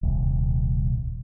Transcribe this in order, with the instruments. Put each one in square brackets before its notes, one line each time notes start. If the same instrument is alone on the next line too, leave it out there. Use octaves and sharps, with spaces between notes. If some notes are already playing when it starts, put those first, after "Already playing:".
[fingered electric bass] D#1 C2